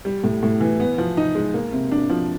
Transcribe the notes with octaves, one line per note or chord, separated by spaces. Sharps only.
G3
A2
A2
E3
B3
F3
D#4
G#3
A#3
C3
D4
F3